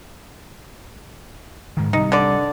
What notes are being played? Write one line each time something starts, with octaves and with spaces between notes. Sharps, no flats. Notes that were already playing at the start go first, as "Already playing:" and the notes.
G#2 D#3
C3 G3 D#4
D3 D5